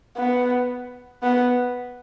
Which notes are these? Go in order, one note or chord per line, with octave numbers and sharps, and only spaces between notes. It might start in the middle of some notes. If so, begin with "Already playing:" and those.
B3
B3